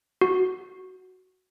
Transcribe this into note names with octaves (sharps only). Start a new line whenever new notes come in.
F#4